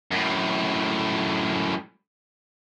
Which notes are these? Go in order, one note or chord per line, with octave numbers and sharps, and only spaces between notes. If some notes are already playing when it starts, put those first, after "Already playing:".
F#2 A2